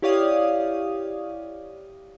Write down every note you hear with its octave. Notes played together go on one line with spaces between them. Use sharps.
E4 G4 C#5 D5 F5 D#6